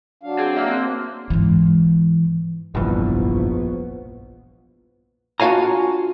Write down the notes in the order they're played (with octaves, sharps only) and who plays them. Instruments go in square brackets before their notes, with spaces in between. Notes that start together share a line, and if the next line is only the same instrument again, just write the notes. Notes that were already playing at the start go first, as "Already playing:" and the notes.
[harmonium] F#3 D4 F5
[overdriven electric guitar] C4 [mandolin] G#4
[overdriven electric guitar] A#3 [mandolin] E5
[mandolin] C4 C5 F#6
[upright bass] G#2 E3
[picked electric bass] F1 G2 E3 [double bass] A#1 B3
[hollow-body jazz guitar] D4 F4 F#4 F5 G#5 A#5